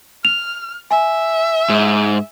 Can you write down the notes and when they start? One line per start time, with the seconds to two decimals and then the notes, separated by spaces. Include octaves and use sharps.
0.25 F6 F7
0.91 E5 G#5
1.69 G#2